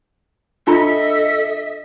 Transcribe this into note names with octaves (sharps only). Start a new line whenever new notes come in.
D4 F4 A4 D#5 E5 A#5